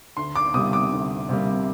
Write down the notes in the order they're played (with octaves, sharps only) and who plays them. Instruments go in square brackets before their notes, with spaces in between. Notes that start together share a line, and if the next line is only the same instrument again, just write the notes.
[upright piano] D2 C6
D6
C3 G3 A#3 D#6
D6
D2
C3 G3 A#3